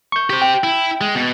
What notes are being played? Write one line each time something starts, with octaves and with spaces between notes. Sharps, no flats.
C#6 G6
G4 C5
G5
E4
G#3
B2